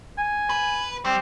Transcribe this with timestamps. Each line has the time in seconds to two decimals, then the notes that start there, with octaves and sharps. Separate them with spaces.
0.18 G#5
0.50 B4
1.05 G3 C4